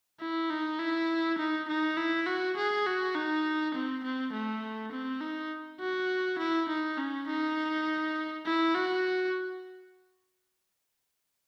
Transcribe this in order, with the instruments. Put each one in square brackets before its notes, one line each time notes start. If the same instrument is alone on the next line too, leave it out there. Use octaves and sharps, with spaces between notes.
[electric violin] E4
D#4
E4
D#4
D#4
E4
F#4
G#4
F#4
D#4
C4
C4
A3
C4
D#4
F#4
E4
D#4
C#4
D#4
E4
F#4